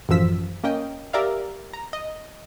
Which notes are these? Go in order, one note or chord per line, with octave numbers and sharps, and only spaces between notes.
A1 F#2 F3 E6 B6
A#3 C#4 D#5 G5
G4 A#4 D5 E5 F5
A#5
D#5